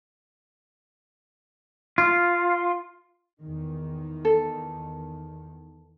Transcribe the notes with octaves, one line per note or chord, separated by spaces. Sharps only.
F4
E2 D#3
A4